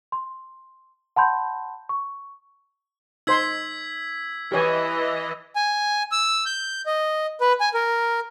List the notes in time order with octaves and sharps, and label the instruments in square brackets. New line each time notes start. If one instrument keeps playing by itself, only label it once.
[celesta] C6
F#5 A5 B5 C6 G6
C#6
[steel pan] D#4 C5 C6 [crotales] E6 G#6 B6
[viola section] E3 D#5 [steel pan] G4 C#5 G#5
[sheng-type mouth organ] G#5
E6
G6
D#5
B4
G#5
A#4